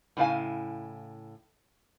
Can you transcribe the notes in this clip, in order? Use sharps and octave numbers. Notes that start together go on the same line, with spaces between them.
A2 C#3 E4 D5 F5 G#5